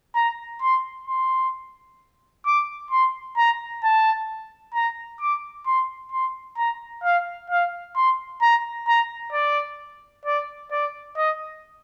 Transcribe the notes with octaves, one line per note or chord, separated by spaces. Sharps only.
A#5
C6
C6
D6
C6
A#5
A5
A#5
D6
C6
C6
A#5
F5
F5
C6
A#5
A#5
D5
D5
D5
D#5